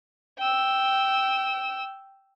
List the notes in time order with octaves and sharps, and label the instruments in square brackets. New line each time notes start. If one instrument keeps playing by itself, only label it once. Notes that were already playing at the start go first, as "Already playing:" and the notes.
[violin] G5 E6